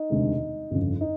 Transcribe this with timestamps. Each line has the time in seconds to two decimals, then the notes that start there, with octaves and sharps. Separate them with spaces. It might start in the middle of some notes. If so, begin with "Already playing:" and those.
Already playing: D#4
0.10 E1 D2 C3 D#3 G#3
0.71 G1 F2 C#3
1.01 D#4